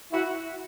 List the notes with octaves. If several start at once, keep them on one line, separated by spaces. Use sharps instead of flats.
E4 F#4